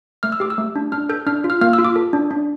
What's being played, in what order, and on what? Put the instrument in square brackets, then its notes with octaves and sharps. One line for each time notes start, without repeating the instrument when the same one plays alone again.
[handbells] A3 F6
E6
G4 D6
E6
A3
D4
D4 F6
A4 G6
D4 F6
F4
F6
A#3 F6
E6
F4
D6
A4
D4
D4